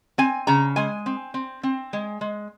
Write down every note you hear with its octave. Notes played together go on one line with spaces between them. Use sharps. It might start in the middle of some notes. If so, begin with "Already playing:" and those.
C4 G#5
C#3 A#5
G#3 G#5
C4
C4
C4
G#3
G#3